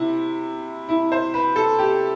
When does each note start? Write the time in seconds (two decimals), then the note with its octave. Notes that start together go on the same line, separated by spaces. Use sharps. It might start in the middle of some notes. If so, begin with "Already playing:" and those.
Already playing: C3 E4
0.89 E4
1.12 C5
1.34 B4
1.56 A4
1.79 G4